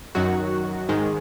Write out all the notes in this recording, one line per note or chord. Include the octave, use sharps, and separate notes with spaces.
F#2 D#3 F#3 F#4
G#2 D#3 G#3